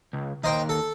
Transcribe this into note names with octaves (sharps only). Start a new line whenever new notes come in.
C#2
D#2 D#4 C5 G5
A4 A5